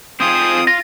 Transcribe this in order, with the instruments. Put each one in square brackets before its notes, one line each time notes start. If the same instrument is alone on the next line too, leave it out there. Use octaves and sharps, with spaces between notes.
[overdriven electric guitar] C4 F4 [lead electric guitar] G#4 C5 [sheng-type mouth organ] D#6
[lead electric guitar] F4 [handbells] A#6